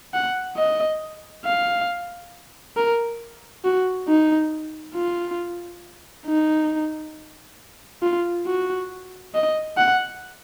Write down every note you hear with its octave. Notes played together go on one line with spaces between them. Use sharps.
F#5
D#5
F5
A#4
F#4
D#4
F4
D#4
F4
F#4
D#5
F#5